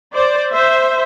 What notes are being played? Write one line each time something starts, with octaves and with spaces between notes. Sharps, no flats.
C5 D5
C5 E5